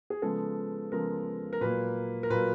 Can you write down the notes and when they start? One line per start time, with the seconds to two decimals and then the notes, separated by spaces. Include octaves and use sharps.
0.10 G#4
0.22 C#3 F3 G#3 B3 A4
0.92 C#3 F3 G#3 B3 A#4
1.53 A#4
1.61 A#2 F#3 A#3 B4
2.23 A#4
2.30 A#2 F#3 A#3 B4